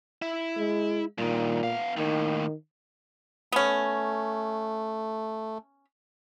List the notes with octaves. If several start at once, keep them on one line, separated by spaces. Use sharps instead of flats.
E4
G#3
G2 A#2 D#3
B3 F5
D#2 A2 D#3
A3 B3 C#4